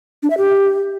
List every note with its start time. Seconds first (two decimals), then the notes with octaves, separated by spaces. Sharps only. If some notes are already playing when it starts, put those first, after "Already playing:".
0.23 D4
0.30 E5
0.38 G4